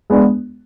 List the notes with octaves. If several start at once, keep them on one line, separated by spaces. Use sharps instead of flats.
G#3 B3 D4